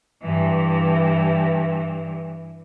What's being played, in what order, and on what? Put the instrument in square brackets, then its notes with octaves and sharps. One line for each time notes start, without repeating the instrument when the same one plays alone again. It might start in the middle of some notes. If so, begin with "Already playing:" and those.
[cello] G2 E3